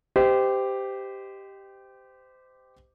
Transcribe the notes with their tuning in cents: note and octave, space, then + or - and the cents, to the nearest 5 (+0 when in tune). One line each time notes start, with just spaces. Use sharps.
G4 +0 C5 -30 D#5 +0